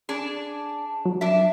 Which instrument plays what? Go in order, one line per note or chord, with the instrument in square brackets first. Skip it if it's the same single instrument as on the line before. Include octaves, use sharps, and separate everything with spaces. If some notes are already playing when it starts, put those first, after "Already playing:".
[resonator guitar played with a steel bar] D4 G#4
[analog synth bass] F#3
[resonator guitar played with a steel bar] D4 E5